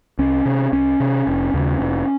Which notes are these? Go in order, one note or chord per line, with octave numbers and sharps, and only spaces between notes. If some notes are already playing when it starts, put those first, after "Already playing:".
C2 C#4
C3
C2 C#4
C3
F1
D#2 C#3
F1